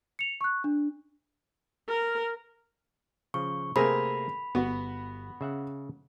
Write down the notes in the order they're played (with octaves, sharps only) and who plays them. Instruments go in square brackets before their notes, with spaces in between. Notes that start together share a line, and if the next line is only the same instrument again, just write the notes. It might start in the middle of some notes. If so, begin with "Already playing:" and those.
[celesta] C#7 F7
C#6 F#6
D4
[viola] A#4
[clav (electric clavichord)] C#3 F3 [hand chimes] C#6
[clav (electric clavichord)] C3 A3 A#3 [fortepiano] C4 G#4 A#4 [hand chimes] B5
[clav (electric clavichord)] G1 [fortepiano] B3 F#4
[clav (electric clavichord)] C#3 E5 F#5